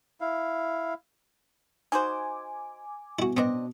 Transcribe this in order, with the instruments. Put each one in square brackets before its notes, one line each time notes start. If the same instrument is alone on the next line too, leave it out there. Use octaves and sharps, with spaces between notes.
[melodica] E4 F5
[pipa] D#4 F#4 C5 [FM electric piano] G#5 D6
[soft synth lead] B2 [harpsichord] E4 F#4
[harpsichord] B3 [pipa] C4 D4 D#5